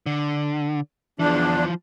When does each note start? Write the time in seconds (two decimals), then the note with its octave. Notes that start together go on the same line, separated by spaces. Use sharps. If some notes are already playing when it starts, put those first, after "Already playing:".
0.06 D3
1.19 E2 E3 F3 D4